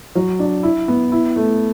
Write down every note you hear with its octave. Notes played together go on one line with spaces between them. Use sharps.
F#3
D4
E4
B3
E4
A3